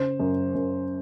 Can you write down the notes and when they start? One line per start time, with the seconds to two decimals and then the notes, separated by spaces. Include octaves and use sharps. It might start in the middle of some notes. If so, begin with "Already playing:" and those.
Already playing: C#3 C5
0.20 F#2
0.55 F#2